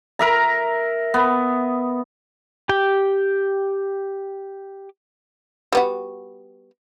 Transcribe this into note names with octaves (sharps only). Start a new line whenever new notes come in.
A#4 E5 A#5
B3
G4 G5
G3 B3 F#4